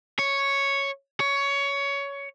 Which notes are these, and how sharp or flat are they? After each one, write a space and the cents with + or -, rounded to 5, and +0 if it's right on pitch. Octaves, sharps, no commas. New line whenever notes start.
C#5 +0
C#5 +15